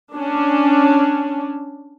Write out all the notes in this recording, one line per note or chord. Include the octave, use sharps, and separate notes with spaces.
C#4 D4